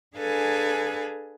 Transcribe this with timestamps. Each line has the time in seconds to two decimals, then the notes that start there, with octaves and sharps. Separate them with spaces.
0.17 D4 G#4 A4 B4 F5 G#5